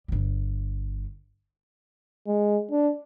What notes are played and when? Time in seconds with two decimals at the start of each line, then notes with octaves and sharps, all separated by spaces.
0.08 G1 G3
2.27 G#3
2.71 D4